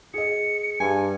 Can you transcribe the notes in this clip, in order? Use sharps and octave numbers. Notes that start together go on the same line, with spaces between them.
G#4 D#5 C#7
G2 G#5